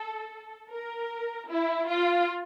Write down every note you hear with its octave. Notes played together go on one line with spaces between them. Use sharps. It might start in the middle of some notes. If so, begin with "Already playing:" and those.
Already playing: A4
A#4
E4
F4